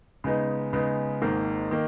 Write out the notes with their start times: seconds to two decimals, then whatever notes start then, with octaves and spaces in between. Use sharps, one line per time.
0.24 C#3 G#3 B3 D#4
0.73 C#3 G#3 B3 D#4
1.22 G#1 G#2 D#3 A#3
1.71 D#3 A#3